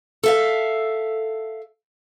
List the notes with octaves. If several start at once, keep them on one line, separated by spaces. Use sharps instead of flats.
A4 E5 F5